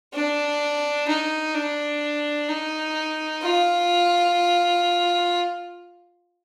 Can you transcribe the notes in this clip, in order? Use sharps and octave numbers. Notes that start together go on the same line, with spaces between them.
D4
D#4
D4
D#4
F4